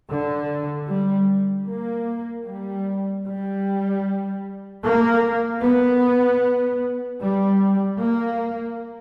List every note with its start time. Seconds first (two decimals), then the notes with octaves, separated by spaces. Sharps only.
0.10 D3
0.89 G3
1.68 A#3
2.47 G3
3.26 G3
4.83 A#3
5.62 B3
7.21 G3
7.99 A#3